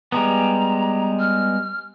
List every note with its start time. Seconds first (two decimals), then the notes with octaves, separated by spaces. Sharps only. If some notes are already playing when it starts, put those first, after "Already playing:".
0.12 G3 G#3 B3 A#5
1.20 F6